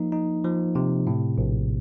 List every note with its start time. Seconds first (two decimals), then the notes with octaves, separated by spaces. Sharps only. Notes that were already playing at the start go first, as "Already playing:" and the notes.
Already playing: F3 A#3 D#4
0.12 D#4
0.44 F3
0.75 C3
1.07 A2
1.38 A#1